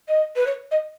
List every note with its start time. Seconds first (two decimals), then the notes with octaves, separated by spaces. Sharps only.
0.08 D#5
0.36 B4
0.46 C#5
0.71 D#5